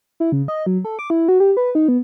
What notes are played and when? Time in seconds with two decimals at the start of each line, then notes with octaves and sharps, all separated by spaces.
0.20 E4
0.32 C#3
0.48 D#5
0.66 F#3
0.85 A4
0.99 D6
1.10 E4
1.28 F#4
1.40 G4
1.57 B4
1.75 D#4
1.88 B3